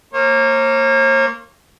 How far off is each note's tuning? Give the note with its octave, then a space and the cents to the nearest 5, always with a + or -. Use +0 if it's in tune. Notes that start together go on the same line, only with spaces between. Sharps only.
A#3 -15 C#5 -45